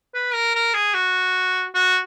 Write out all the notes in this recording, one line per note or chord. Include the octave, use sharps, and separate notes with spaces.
B4
A#4
A#4
G#4
F#4
F#4